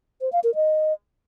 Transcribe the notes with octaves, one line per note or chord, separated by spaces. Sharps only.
C5
F5
A#4
D#5